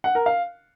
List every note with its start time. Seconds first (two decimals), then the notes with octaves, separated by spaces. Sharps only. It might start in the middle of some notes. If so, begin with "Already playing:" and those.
0.04 F#5
0.15 A#4
0.26 F5